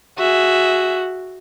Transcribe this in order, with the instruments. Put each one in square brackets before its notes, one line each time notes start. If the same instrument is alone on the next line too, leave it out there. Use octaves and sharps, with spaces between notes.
[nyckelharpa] F#4 [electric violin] G#4 E5